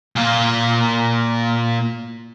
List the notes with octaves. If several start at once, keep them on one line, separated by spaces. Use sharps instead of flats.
A#2 F4